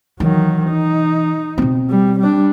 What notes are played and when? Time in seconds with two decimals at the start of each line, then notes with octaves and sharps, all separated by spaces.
0.20 D#3 E3 F#3
0.70 D#4
1.58 B2 C4
1.90 G3
2.20 G3 D4